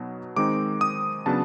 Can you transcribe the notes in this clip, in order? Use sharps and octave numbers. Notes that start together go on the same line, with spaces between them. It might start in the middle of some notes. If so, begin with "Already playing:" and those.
Already playing: B2 F#3 B3 D#4
D#3 G#3 C4 D#4 D6
D#6
C#3 F#3 B3 D4 A5